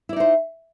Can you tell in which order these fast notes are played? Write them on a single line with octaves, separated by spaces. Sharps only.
E4 D5 D#4 C5